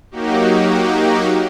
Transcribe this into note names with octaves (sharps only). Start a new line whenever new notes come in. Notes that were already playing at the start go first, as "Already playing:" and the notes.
F#3 A#3 D#4 F#4 G4